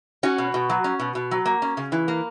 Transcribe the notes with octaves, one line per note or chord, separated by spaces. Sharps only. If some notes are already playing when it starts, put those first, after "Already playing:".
C#4 F#4
B2
B2
F#3
C#4
B2
B2
F#3
A#3
C#4
C#3
E3
A#3